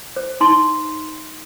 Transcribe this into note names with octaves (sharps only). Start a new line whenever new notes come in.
C5
D#4 C6